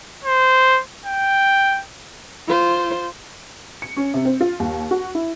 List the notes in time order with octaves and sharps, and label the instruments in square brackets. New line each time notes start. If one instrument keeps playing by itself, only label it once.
[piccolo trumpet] C5
G5
[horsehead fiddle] F4 C5
[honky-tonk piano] C#7
C#4
C3
C4
F4
D#2
F#4
E4